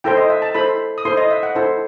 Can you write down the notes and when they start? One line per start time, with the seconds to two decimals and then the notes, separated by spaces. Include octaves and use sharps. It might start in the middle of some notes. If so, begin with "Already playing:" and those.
0.04 E4 A4 C5 G5
0.17 D#5
0.30 E5
0.42 A5
0.54 E4 A4 C5 B5
0.98 D#6
1.05 E4 A4 C5 C6
1.17 D#5
1.30 E5
1.43 F#5
1.55 E4 A4 C5